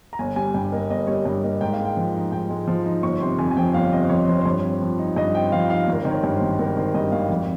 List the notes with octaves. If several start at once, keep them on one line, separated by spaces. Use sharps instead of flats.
A#5
G1 G#5
G3 G#5
G2 G5
A#3 D#5
G1 D#5
G3 C#5
G2 D#5
A#3 D#5
G#2 G5
F5
G#3
G5
F3
D#4
G#2 G5
G#3
F3
D#4
G1 C#6
C3 C6
F2 G#5
G#5
F3 G5
G1 F5
C3 D#5
C5
F2 C#5
F3 C5
C5
G2 C#5
C4
F3
D#4
G2 D#5
C4 G5
F3 F5
D#4 F5
G#1
A#4
D#3 C5
C#5
G2
C5
G#1
G#1 A#4
D#3 C5
G2 D#5
G#1 F5
F2